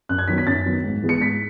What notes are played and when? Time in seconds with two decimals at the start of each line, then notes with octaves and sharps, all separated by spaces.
0.09 F#2 F#6
0.18 G#6
0.28 D#3 F#3 B3 B6
0.38 B6
0.47 F#2 A6
0.66 D#3 F#3 B3
0.84 G#2
1.02 E3 G#3 B3
1.09 C#7
1.21 G#2 B6